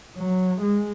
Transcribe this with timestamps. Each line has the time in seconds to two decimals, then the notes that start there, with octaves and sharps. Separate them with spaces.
0.18 F#3
0.62 G#3